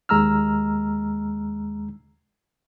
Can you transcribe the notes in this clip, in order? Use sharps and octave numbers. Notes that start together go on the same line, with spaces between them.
D#2 G#3 A#5 E6 F6